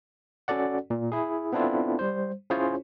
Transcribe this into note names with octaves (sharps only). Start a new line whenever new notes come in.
C#4 F#4 A4 D5 F#5
A#2
E4 G#4
B3 C4 D4 E4 F4 A4
G3 C5
C#4 E4 F4 G#4 C5 C#5